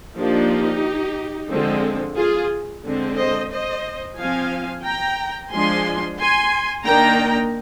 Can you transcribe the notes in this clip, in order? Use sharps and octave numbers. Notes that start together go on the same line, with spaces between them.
F3 A#3 D4 D#4 G4
D3 F3 G#3 C4
F4 G#4
D3 G#3 C4
C5 D#5
C5 D#5
F3 C4 F5 G#5
G5 A#5
F3 G#3 D4 G#5 C6
G#5 C6
D#3 A#3 D4 G5 A#5